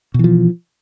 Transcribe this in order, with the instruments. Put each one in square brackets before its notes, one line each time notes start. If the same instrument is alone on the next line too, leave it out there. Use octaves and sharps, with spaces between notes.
[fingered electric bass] B2
E3
F3